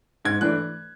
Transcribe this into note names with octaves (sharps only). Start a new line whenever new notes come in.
G#2 G#6
E3 A3 D4 F#6